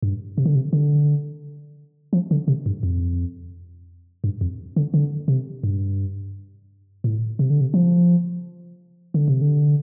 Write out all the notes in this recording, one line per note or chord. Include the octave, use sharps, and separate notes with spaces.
G2
C3
D3
C3
D3
F3
D3
C3
G2
F2
G2
F2
D3
D3
C3
G2
A2
C3
D3
C3
F3
D3
C3
D3